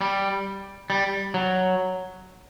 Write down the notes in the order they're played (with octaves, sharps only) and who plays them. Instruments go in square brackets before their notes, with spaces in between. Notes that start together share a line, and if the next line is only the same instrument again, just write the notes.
[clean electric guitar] G3
G3
F#3